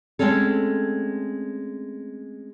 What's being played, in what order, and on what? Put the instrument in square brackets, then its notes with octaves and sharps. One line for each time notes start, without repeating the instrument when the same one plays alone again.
[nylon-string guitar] G#3 A3 C4 C#4 A4